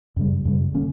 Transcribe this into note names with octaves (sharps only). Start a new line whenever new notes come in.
F#2 C#3 G3
F#2 C#3 G3
D3 A#3 C#4